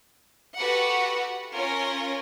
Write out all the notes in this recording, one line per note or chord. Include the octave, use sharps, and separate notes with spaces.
F#4 G4 A4 B4 F#5
C#4 F4 A#4 C#5 G#5 A#6